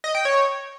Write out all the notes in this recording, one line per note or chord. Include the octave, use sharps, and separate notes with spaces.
D#5
G5
C#5